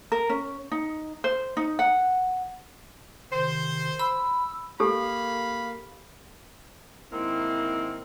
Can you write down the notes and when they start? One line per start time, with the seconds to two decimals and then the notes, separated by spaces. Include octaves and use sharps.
0.12 A#4
0.29 C#4
0.72 D#4
1.24 C5
1.57 D#4
1.79 F#5
3.31 C3 D#3 C5
3.99 B5 E6
4.80 A#3 G4 A4 F5 B5
7.13 G#2 D#3 A#3 C4 E4